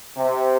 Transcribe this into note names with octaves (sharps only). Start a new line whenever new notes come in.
C3